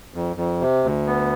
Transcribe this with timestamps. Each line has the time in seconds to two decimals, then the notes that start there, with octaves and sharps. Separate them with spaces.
0.14 F2
0.37 F2
0.61 C3
0.84 D2
1.07 B3